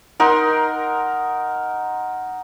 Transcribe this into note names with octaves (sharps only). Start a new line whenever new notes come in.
D#4 A#4 F#5 C6